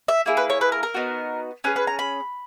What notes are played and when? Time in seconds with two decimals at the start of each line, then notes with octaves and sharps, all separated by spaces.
0.08 E5
0.26 A#3 E4 G#4
0.37 B4
0.50 C#5
0.61 B4
0.72 A#4
0.83 A#4
0.94 B3 D#4 F#4
1.64 C#4 G#4 B4
1.76 B4
1.87 A#5
1.99 B5